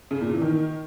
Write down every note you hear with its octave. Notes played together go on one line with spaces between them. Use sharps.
C#3
A#2
E3
D#3